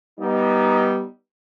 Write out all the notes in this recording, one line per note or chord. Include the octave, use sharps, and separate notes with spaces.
G3 B3 D#4